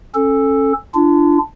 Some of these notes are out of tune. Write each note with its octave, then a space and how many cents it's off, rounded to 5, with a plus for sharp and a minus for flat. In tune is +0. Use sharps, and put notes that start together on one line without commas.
C#4 -25 A4 +0
D4 +0 F4 -40